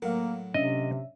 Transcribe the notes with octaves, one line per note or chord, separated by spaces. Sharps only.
A2 F#3 A#3 A#4 F5
C3 C#4 D4 D#5 E5